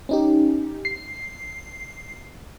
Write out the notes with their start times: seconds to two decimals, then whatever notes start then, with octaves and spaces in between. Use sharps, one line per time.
0.09 C#4 D#4 G4
0.85 C7